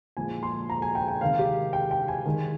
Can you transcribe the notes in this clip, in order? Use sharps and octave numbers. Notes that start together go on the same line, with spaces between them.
A#2 F3 G#3 G#5
C6
A#5
G#5
G5
G5
C3 D#3 G#3 F5
G4
G5
G5
G#5
D#3 G#3